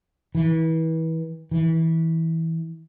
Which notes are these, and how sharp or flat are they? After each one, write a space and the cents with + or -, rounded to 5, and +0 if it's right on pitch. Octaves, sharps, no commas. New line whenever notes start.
E3 -30
E3 -20